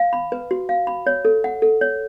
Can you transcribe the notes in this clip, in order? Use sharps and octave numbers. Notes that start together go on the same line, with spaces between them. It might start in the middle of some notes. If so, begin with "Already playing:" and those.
Already playing: F5
B5
B4
F#4
F5
B5
C#5
A4
F#5
A4
C#5